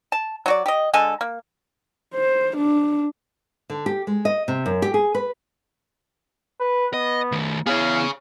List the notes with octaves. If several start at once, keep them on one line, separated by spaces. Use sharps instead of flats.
A5
F#3 F#4 D5
G4 D#5
D3 G#3 A4 G#5
A#3
C5
D4
D3
G4
G#3
D#5
C3
F#2
G4
G#4
B4
B4
B3 D#5
D#3 A3
B3 E4 G#4 C#5 F5